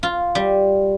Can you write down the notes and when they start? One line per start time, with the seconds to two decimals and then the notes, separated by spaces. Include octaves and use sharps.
0.03 F4
0.35 G3